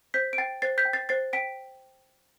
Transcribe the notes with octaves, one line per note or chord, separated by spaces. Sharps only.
C5 G6 B6
D7
G5 A6 C7
C5 A6 C7
G6 B6
G5
A6 C7
C5 A6 C7
G5 B6 D7